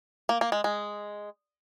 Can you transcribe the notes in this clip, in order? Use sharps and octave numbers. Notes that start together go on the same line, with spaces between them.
A#3
A#3
G#3
G#3